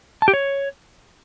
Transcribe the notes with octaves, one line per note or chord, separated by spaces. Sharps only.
A5
G4
C#5